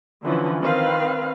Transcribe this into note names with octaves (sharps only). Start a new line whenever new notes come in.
D3 E3 F3 C#4
D#3 C4 B4 F5